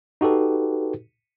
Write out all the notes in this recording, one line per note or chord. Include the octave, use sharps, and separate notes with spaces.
D#4 F#4 G4 A4 B4